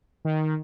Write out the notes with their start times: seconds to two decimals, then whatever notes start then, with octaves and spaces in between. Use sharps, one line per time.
0.25 D#3